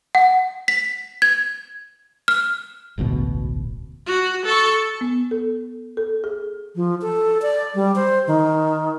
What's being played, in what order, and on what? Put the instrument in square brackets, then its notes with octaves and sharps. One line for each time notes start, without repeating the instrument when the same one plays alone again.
[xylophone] F#5
B6
G#6
F6
[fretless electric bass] E1 A1 D2 B2
[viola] F#4
A4 C#6
[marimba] B3
A4
A4
G#4
[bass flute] F3
A4
D5
G3
C5
D#3